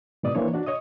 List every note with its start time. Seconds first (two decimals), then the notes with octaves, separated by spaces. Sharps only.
0.23 G#2 B2 D5 D#6
0.35 E3 A#3 D4 C5 C#5
0.54 D4 F#4 D5
0.66 C#5 D#5 D#6